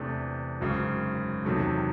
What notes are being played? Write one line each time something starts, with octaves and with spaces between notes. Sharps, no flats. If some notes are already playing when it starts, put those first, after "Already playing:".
Already playing: E2 C3 E3 A3 D4
G#1 F#2 C#3
E2 C3 D#3 F#3 A3